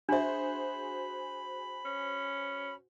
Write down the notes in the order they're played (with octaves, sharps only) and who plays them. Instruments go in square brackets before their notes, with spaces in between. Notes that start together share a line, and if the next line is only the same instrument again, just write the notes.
[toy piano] D4 E5 [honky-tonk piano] F#4 G#4 C5 [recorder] B5
[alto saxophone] C#4